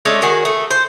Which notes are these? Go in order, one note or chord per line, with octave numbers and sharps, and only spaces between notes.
G#3 A3 C#4 D5
D#3 F#4 G#4
A3
C5